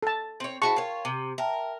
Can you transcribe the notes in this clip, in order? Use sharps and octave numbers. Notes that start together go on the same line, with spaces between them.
A4 A5
C4 C#5
E4 F#4 G#4 C5 A5 C#6
F4 A#4 C#5 G5
C3 D6 D#7
A#4 E5 G5 A5